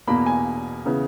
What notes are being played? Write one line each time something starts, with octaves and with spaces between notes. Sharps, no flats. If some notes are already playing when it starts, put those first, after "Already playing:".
E2 B2 A#3 B5
G#5
C#3 E3 B3